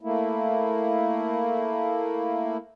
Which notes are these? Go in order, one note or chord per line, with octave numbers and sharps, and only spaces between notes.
A3 A#3 E4